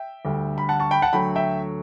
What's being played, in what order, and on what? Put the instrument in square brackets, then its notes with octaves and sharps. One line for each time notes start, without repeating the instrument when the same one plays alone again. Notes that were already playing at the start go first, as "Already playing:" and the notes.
Already playing: [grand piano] E5 G5
D2 D3 G3
B5
F#5 A5
A5 C#6
G5 B5
F#5 A5
D2 D3 F#3 A3 G5 B5
E5 G5